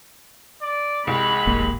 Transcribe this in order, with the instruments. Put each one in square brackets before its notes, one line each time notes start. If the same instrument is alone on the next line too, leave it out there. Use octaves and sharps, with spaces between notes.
[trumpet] D5
[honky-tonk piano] C2 [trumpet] G#3 [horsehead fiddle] B5
[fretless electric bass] D1 G#1 A#3